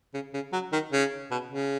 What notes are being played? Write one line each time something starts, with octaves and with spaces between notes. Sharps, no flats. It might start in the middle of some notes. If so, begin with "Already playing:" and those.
C#3
C#3
F#3
D#3
C#3
B2
C#3